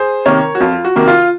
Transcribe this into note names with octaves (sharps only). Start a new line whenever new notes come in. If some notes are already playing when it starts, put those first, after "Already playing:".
Already playing: G#4 C5
C3 D#3 A#3 A#4 C#5
F#4
F2 F4
F#4
C3 D#3 A#3
F4